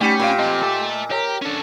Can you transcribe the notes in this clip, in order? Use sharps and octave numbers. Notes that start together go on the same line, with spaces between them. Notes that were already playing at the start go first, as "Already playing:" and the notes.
G3 A3 C#4 G4 C#7
A#2 F5 G5 B5
F3 C4 D#5
A4 E5
G4 A#4 C#5
C#4 D4 A4